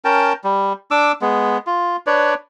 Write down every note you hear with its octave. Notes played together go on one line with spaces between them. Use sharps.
C#4 A#4 G5 A5
G3
D4 D6 E6
G#3 B3
F4
D4 B4 C#5 D5